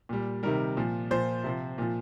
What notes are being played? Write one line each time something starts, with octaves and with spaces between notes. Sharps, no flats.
A#2 G3
C3 D#3 G3 A#4
A#2 F3
A#2 F3 C5
C3 F3
A#2 F3